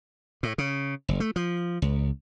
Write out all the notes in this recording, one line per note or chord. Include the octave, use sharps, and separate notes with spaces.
A2
C#3
F#1
A3
F3
C#2